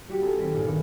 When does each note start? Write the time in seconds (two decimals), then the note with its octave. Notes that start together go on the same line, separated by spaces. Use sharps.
0.08 G3 F#4 G4
0.21 B3 D#4 F4 G#4 A4
0.37 D#3 G3 C4
0.51 B1 G2 A#2 B3 G#4 F6
0.66 D#3 B3 D4